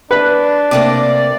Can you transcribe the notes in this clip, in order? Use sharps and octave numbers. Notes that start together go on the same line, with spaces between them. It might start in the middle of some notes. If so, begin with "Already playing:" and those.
D4 B4
C3 A3 A#3 D5